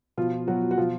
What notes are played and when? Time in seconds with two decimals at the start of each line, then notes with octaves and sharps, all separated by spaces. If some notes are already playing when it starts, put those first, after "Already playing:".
0.17 B2 F3 F4
0.48 B2 F#3 F#4
0.71 F#4
0.78 B2 F3 F4